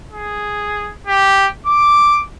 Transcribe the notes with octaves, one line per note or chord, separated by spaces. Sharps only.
G#4
G4
D6